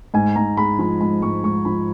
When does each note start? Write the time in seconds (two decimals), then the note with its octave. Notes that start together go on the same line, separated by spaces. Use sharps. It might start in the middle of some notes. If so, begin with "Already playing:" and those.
0.14 G#2 G#5
0.36 G#2 A#5
0.57 G#3 B5
0.79 F3 B5
1.01 G#2 B5
1.22 G#2 C#6
1.43 G#2 C#6
1.65 F3 B5